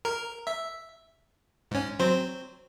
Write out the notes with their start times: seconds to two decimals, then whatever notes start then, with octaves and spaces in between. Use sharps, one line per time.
0.05 A#4
0.47 E5
1.71 G#2 C#4
1.99 F#3 C4 C5